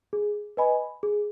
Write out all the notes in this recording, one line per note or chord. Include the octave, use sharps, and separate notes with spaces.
G#4
B4 D#5 G#5 B5
G#4